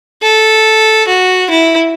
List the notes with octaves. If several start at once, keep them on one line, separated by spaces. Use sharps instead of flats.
A4
F#4
E4